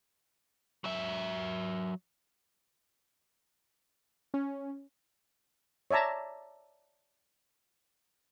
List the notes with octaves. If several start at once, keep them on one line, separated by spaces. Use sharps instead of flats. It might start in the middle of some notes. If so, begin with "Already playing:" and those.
F#3 E5
C#4
C#5 D5 E5 A5 A#5